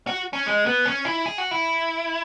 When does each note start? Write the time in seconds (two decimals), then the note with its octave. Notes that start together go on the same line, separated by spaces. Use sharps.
0.07 F#4
0.33 C#4
0.46 G#3
0.66 B3
0.86 C#4
1.05 E4
1.26 G#4
1.38 F#4
1.51 E4